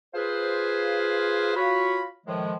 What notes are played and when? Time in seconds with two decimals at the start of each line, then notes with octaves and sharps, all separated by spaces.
0.14 F4 G#4 B4 C5
1.55 F4 F#4 C#5 B5
2.26 A2 D#3 F3 G#3